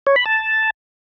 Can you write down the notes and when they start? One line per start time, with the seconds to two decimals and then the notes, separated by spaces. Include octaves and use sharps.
0.07 C#5
0.16 B5
0.26 A5